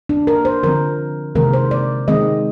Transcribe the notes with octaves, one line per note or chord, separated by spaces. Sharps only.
D4
A#4
C5
D3 F3 C4 A#4
C3 D#3 G#3 C4 A#4
C5
D5
D#3 G#3 C4 D#5